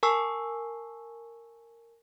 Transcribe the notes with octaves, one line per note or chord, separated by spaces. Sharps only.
A#4 G#5 A5 C#6 E6 C7